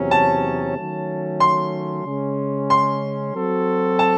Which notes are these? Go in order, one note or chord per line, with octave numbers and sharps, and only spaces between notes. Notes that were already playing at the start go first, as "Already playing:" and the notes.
Already playing: E2 C3 F#3 C#4
A5
D#3 F#3 A3 C#4
C6
C#3 G#3 C#4
C6
F#3 C4 F#4 A4
A5